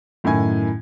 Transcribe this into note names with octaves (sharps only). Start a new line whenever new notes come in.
F#2 A2 D#3 E4 G#5 G#6